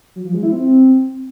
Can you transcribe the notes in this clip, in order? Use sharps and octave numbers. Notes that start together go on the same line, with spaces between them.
F#3
F3
G#3
E4
C4